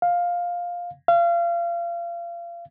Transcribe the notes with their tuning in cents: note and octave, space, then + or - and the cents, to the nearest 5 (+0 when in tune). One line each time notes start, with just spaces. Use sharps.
F5 +10
F5 -30